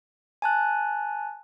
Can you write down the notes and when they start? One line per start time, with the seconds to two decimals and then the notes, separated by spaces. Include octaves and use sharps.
0.42 G#5 A5 F#6